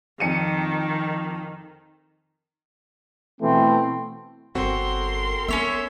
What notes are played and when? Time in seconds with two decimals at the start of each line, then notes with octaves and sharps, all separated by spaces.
0.20 F2 D#3 C#7 D#7
3.41 B2 E3 A3 C4
4.55 G1 C4 F#4 A4 A#4 C6
5.48 B3 C#4 C#5 E5